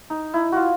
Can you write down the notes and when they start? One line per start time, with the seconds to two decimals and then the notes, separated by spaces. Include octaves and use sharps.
0.10 D#4
0.34 E4
0.52 F4 F#4